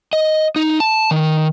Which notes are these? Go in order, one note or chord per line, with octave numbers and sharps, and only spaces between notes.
D#5
D#4
A5
D#3